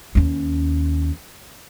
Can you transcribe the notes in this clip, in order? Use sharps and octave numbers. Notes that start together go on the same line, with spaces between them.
D#2 C#4